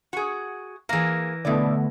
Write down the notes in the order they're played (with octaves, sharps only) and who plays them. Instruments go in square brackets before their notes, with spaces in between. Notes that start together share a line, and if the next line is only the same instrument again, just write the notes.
[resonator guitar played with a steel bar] F#4 G#4
[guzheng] E3 A#4 [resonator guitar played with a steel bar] A#3 G#4
[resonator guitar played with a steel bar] B2 E4 D5 [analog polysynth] D3 A3 B3